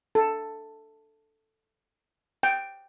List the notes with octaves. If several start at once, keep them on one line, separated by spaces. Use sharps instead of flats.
A4
G5